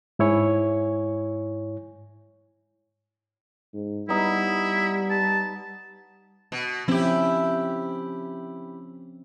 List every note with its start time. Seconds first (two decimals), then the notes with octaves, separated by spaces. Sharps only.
0.19 G#2 E4 C#5 G#5
3.74 G#2
4.09 G3 B3 D#4 E4
5.10 A5
6.52 B2
6.88 F3 C4 C#4 E4 G4